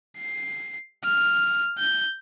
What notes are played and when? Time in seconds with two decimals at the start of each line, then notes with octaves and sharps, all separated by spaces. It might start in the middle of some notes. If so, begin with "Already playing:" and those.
0.18 C7
1.04 F6
1.79 G6